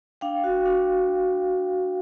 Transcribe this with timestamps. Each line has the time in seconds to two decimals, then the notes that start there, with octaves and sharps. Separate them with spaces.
0.21 D4 F5 G5
0.44 F#4
0.65 D4